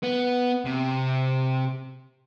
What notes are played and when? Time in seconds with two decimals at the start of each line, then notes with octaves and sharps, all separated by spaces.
0.03 B3
0.65 C3